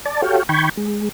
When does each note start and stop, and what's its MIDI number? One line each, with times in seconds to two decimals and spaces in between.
0.06 0.21 74
0.06 0.21 81
0.22 0.43 66
0.22 0.43 67
0.22 0.43 69
0.22 0.43 73
0.22 0.43 77
0.22 0.43 79
0.49 0.69 51
0.49 0.69 79
0.49 0.69 83
0.49 0.69 85
0.49 0.69 91
0.49 0.69 92
0.77 1.09 56